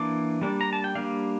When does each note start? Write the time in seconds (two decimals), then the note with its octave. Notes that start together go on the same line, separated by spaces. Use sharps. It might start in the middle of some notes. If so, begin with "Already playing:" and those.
Already playing: E3 A#3 D4 D6
0.41 G3 A#3 D4
0.61 A#5
0.73 A5
0.84 G5
0.95 G3 A#3 D4 F5